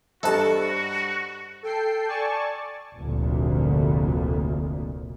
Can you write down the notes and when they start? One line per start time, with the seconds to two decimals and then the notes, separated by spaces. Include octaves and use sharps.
0.23 G2 F#4 G4 A4 C5 D#5 A5 A#5
1.63 A4 G5 C7
2.08 D5 G#5 A5 C#6
2.96 F1 D2 A#2